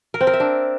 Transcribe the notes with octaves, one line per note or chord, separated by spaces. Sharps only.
A#4
C4
A#4
E5
D4